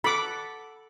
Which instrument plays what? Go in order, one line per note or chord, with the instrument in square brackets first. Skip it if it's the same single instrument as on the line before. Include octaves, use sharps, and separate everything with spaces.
[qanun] A4 F#5 [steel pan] B5 D6